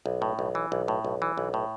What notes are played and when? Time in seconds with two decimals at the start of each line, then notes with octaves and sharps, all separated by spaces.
0.06 B1
0.22 A2
0.39 B1
0.55 E3
0.72 B1
0.88 A2
1.05 B1
1.22 E3
1.38 B1
1.54 A2